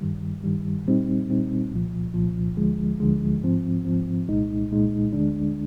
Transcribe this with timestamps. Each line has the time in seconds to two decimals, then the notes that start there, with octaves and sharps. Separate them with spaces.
0.01 G2 D#3 G3
0.44 G2 D#3 G3
0.85 A#2 G3 C4 D#4
1.29 A#2 G3 C4 D#4
1.71 C2 A#2 F3
2.14 C2 A#2 F3
2.57 D2 D3 F3 G#3
3.00 D2 D3 F3 G#3
3.42 G#2 F3 C4
3.85 G#2 F3 C4
4.28 C2 A#2 G#3 D#4
4.70 C2 A#2 G#3 D#4
5.13 D2 D3 G#3 D4